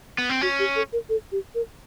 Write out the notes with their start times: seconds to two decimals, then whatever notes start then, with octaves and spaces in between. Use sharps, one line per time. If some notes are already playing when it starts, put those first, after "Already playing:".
0.18 B3
0.29 C4
0.41 C#4 F#4
0.59 G4
0.76 A4
0.93 A#4
1.09 A4
1.32 G4
1.55 A#4